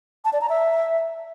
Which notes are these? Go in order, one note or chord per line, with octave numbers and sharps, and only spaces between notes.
A5
D5
A#5
E5